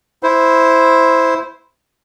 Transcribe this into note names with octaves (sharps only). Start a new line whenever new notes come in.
E4 C5